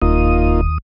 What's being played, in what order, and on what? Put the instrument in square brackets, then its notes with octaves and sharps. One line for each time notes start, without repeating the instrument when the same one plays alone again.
[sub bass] E1 [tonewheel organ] D#2 D#6 [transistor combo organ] A#3 D#4 F4